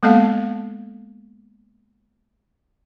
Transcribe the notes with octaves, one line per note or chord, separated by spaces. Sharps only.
G#3 A#3 B3 A4 F5 A5